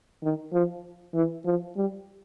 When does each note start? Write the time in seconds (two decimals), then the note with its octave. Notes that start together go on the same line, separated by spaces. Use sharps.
0.23 D#3
0.53 F3
1.14 E3
1.45 F3
1.76 G3